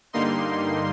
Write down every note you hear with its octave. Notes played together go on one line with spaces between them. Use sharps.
G2 D3 G3 A#3 D#4 C6